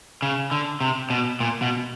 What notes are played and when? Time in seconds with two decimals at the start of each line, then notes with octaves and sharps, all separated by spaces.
0.22 C#3
0.51 D3
0.81 C3
1.10 B2
1.40 A#2
1.62 B2